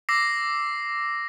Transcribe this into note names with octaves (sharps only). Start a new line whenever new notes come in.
D6 E6 A#6 C7